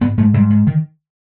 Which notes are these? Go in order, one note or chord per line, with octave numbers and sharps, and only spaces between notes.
G#2 B3
G#2 A3
G#2 G3
G#2
D#3